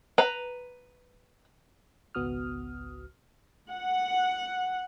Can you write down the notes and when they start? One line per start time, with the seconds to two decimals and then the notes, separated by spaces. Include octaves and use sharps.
0.18 B4 A#5
2.15 G#1 C#2 B3 F#4 D#6 F6
3.71 F#5